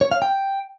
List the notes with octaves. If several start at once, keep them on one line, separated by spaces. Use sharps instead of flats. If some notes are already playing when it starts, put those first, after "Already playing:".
C#5
F5
G5